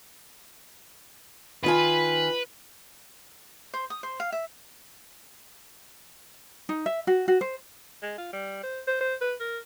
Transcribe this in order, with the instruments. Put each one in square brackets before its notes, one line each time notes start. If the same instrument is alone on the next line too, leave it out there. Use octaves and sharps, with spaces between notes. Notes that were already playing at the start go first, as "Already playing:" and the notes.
[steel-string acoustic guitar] D#3 F4 G#5 [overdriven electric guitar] B4
[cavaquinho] C5
D#6
C5
F5
E5
[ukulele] D#4
E5
F#4
F#4
C5
[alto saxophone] G#3
F4
G3
C5
C5
C5
B4
A#4